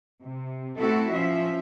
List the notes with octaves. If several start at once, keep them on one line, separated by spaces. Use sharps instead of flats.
C3
A3 B3 C4 E4 F#4 A4
F3 C#4 E5